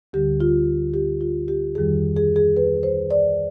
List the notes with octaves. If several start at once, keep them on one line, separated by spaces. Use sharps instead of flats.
D2 D3 G3 G4
F4
G4
F4
G4
F2 D#3 G3 G#4
G#4
G#4
B4
C5
D5